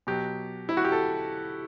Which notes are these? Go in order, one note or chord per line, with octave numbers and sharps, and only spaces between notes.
B2 F#3 G4
E4
F#4
G4
A4